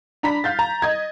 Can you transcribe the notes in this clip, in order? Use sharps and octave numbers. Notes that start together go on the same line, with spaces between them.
D4 A#5 B5 B6
F5 G6 A6
A#5
D#5 G#6